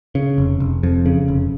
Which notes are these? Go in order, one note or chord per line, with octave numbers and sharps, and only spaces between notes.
C#3
F1
F1
F2
C#3
F1